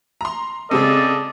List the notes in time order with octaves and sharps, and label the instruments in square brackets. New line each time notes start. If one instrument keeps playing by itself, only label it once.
[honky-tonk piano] A#5 C6
[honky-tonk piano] C#3 G#3 C4 [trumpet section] A4 D5 D#5